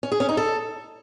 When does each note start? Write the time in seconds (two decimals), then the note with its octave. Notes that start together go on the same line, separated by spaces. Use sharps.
0.03 C#4
0.12 G#4
0.20 C#4
0.29 D#4
0.37 A4